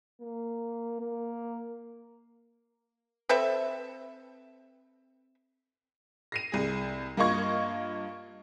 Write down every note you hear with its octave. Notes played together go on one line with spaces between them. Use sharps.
A#3
A#3
C4 A4 B4 E5
A#6 C7 D#7
C2 G#4
G2 A#3 F4 D#5 C#6 G#6